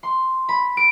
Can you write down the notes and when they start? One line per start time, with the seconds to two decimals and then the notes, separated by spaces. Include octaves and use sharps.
0.03 C6
0.49 B5
0.77 D7